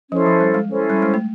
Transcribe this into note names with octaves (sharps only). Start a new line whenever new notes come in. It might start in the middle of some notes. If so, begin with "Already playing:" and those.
F3 C#4 E4 A4 C5
F3
G3
G#3
C#4 E4 A4 C5
G3
G#3
A3